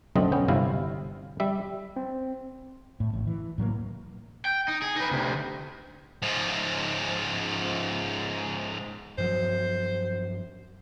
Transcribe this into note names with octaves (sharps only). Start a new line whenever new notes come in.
B1 F#2 D3 A3 C4 D#5
B3 C#4 G5
G1 C3 E4 F5
G3 E5
C4
A2
A1
E3
A2 F#3 G#3 A#3
G5
D#4
G#4
D#4 B4
D2 C3
G#2 F3
G2 F3 F#3 C5